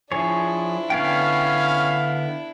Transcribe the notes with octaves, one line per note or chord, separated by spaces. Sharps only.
F3 D4 E4 G#4 C#5
D3 B3 C#4 F5 G5